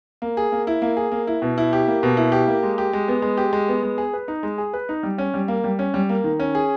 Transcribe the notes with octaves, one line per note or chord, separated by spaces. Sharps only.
A#3
G#4
A#3
E4
A#3
G#4
A#3
E4
B2
E4
G4
A#3
B2
E4
G4
A#3
G#3
G4
G#3
B3
G#3
G4
G#3
B3
G#3
G#4
B4
D#4
G#3
G#4
B4
D#4
G3
C#4
G3
A#3
G3
C#4
G3
A#3
D#3
C#4
G#4